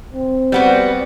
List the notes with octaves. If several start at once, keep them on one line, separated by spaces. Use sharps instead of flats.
C4
G3 B3 F#4